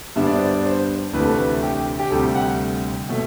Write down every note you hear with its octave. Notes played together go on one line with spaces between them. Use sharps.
G2 D3 G3 B3 D4 E5
D5
C5
D5
C5
D2 C3 E3 A3 D4 B4
A4
B4
G4
G4
D2 C3 G3 A4
F#5
B2 A3